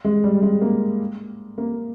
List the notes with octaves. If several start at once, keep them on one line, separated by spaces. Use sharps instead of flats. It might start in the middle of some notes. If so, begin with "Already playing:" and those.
G#3
G3
G#3
A#3
A#3